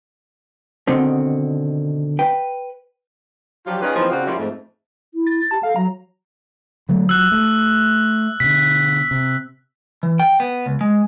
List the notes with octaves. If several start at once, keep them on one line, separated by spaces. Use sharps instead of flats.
B2 D3 D#3 C4
B4 G5
F3 F#3 D4 F4 G4
D#3 C#4 D#4 F4 G#4 B4
E3 F3 G3 A#3 C4 D#4
C#3 C4 D4 F4 F#4
F3 G3 A#3 C#4 E4
F2 G#2 A3
E4
A6
G4 A5
A4 F5
F#3 A#5
D3 F#3 A3
F#3 E6 F#6
A3
B2 D3 B6
C3
E3
G5
B3
C#2
G#3